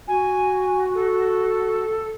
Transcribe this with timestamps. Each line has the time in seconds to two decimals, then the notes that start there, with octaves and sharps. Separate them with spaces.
0.08 F#4 G#5
0.95 A4